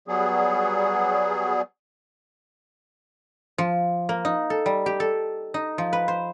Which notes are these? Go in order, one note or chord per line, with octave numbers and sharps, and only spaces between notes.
F#3 G3 B3 G#4
F3
A#3
D#4
A4
G3
G4
A4
D#4
F3
B4
C5